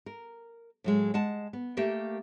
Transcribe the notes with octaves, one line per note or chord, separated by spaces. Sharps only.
A#4
A2 F#3 G#3
G#3 F#5 A5
B3
A3 A#3 G4 A#4